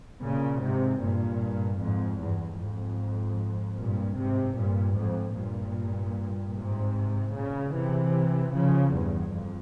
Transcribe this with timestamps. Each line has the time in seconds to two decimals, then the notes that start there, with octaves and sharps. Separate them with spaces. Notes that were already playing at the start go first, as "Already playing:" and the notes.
0.21 A#2 C#3
0.61 G#2 C3
1.00 G2 A#2
1.79 F2 G#2
2.19 E2 G2
2.58 F2 G#2
3.78 G2 A#2
4.17 G#2 C3
4.56 G2 A#2
4.96 F2 G#2
5.35 G2 A#2
6.54 G#2 C3
7.33 A#2 C#3
7.72 C3 E3
8.51 C#3 F3
8.91 E2 G2
9.31 F2